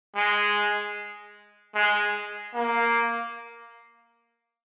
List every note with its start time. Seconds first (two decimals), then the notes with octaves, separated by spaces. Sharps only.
0.16 G#3
1.75 G#3
2.54 A#3